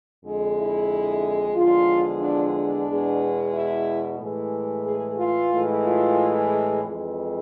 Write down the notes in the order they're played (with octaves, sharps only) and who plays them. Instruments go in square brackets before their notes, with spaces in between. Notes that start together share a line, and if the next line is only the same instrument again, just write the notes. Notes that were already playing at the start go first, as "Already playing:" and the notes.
[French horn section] F2 D3 G#3
E4
E2 D3 F3 G#3 F4
D4
D4
E2 B2 G#3
E4
A2 E3 G#3
G#4
F4
A2 E3 G#3
F4
G#4
F2 E3 G#3